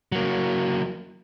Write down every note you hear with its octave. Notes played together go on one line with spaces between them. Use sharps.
F#3 A#3